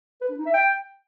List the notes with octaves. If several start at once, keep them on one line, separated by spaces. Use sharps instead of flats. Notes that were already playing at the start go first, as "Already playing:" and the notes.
B4
D4
D#4
E5
G5